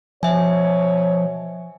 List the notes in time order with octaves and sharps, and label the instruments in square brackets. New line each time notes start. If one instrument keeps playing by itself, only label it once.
[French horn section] B2 C#5 [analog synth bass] F3 [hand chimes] E5 G#5